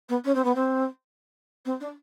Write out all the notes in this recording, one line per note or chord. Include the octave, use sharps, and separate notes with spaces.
B3
C#4
C4
B3
C4
C4
D4